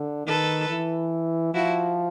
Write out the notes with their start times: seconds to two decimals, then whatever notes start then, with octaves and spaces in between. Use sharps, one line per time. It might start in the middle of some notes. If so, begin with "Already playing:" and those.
Already playing: D3
0.26 D#3 A4 B4
0.69 E3
1.54 F3 E4 F#4